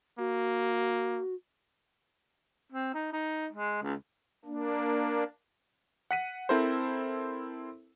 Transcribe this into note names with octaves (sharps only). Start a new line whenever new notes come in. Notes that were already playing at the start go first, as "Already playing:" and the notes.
A#3 F#4
C4
D#4
D#4
G#3
C#2
A#3 D4
F#5 B6 D#7
C4 E4 A4 A#4 C5